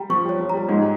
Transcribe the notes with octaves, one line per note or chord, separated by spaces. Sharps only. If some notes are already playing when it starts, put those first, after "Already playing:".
Already playing: G3 G5 A#5
F3 C#6
G3 C#5
F3
G3 A#5
G#2 G#3 D#4